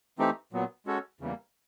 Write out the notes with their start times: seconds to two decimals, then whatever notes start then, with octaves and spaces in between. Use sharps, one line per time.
0.19 E3 A3 C4 D#4 G4
0.53 A#2 F#3 B3
0.86 G#3 C#4 F#4 A4 C#5
1.20 E2 C#3 E3 G3 A#3